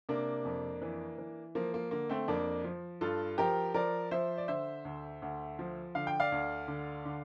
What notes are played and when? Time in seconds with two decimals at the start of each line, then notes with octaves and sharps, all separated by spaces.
0.09 C3 A#3 D4
0.45 F2
0.82 E3
1.18 E3
1.55 F3 A#3
1.74 A#3
1.91 D3 A#3
2.09 A3 C4
2.28 F2 A#3 D4
2.64 F3
3.01 G2 F4 A4
3.38 F3 G4 A#4
3.74 F3 A#4 D5
4.11 F3 C5 E5
4.38 D5
4.48 D3 C5 E5
4.85 D2
5.22 D2
5.59 F3
5.95 D3 F5
6.07 G5
6.20 D5 F5
6.32 D2
6.68 D3
7.05 D3